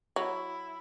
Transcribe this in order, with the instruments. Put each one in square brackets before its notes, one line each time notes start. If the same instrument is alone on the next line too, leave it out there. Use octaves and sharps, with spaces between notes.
[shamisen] F#3 [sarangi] E4